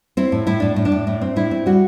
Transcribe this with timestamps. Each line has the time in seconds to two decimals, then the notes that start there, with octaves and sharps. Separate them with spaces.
0.17 C4 E4
0.32 A2
0.47 A2 E4
0.60 A2 D4
0.76 A2
0.85 D4
0.92 A2
1.07 A2
1.21 C4
1.36 A2 E4
1.51 C4
1.66 G3 F#4